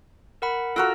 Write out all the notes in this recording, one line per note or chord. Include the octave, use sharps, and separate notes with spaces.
A#4 F#5 B5
F4 F#4 A4 A#4 E6